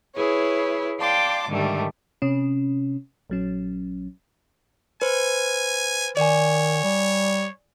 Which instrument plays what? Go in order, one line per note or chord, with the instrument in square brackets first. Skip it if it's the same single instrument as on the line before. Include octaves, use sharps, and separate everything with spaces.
[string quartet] E4 G#4 B4 C#5
D5 F5 G5 A5 C6 D6
G#2 D3 D#3 G3 A3
[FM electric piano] C3 C#4
A#1 F#3 C#4
[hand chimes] B4 C5 [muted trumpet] G#5
[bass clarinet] D#3 [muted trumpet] C#5 [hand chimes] D5 G#5
[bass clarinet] G3